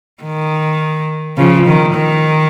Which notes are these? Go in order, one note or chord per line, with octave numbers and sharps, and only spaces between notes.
D#3
C#3 F3
D#3
D#3